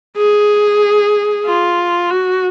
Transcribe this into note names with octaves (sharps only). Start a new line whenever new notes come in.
G#4
F4
F#4